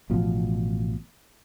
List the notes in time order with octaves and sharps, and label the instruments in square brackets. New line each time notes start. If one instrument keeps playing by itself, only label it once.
[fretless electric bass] A1 B2 F3